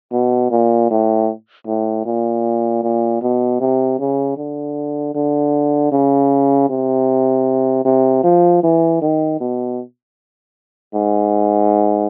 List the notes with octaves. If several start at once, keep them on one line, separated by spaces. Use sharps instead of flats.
B2
A#2
A2
A2
A#2
A#2
B2
C3
C#3
D3
D3
C#3
C3
C3
F3
E3
D#3
B2
G#2